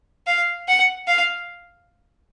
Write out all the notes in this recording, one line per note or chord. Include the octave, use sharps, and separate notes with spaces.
F5
F#5
F5